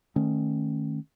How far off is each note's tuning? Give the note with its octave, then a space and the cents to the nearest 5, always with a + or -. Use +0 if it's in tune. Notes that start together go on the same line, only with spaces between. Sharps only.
D#3 -10 A3 +0 C#4 -25